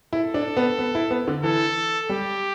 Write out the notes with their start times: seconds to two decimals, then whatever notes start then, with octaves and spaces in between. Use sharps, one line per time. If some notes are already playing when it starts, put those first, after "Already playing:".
0.13 E4 A4
0.34 D4
0.57 B3
0.79 B3
0.95 E4
1.11 B3
1.28 D3
1.43 E3 A4
2.09 G3 G4